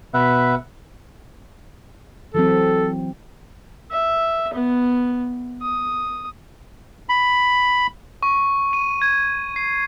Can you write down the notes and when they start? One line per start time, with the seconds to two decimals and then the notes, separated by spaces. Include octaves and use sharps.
0.14 B2 B4 E5 F#5
2.35 E3 F#3 C4 A4
3.91 E5
4.54 B3
5.62 D#6
7.09 B5
8.23 C#6
8.73 D#7
9.02 G#6
9.56 C7